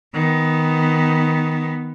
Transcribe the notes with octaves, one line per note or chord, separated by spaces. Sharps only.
D#3 B3